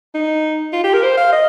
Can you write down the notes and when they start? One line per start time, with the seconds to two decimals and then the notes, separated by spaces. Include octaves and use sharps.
0.15 D#4
0.73 F4
0.84 G4
0.94 A#4
1.03 C5
1.17 F5
1.33 D#5